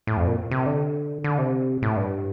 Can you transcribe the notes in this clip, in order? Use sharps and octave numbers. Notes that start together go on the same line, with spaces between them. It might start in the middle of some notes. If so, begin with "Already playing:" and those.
A2
F2
A#2
C3
D3
D3
C3
A2
G2